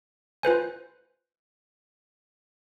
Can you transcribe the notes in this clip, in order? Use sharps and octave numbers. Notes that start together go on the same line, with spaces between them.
F4 B4 C5 G#5